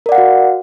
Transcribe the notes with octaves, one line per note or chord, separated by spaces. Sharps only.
F#4 A#4 D5 F5 F#5